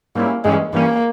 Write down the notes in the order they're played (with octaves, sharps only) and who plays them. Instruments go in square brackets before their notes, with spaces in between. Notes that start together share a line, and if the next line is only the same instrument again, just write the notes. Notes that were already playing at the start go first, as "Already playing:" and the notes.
[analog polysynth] G#2 G3 C#4 E4 [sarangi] A#3
[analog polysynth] G2 E3 G3 C#4 [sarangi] G#3
[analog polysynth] G2 E3 G3 C#4 [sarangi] A#3